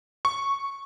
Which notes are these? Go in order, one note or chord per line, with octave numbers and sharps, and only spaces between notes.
C#6